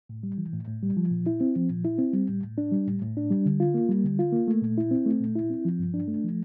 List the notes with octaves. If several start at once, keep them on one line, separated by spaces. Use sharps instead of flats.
A2
G3
E3
A2
A2
G3
F3
A#2
E4
C4
F3
A#2
E4
C4
G3
A2
A2
D4
G3
A2
A2
D4
G3
D3
F4
A#3
G3
D3
F4
A#3
A3
A#2
E4
C4
A3
A#2
E4
C4
F3
G2
D4
A3
F3